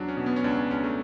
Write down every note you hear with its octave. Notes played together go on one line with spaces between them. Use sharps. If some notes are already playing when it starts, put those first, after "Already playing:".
Already playing: E2 F#3 D4
C#4
B2
B3
C#4
C#2 D4
C#4
C#2 C#4
A3